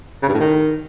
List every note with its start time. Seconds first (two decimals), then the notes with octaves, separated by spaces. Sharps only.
0.23 C#3
0.28 G2
0.34 A2
0.40 D#3